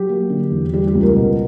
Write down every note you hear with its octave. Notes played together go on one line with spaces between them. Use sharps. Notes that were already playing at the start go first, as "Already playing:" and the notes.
Already playing: F#3 G4
A#3
D3
E2
G3 G4
G4
C#2
A#4
B2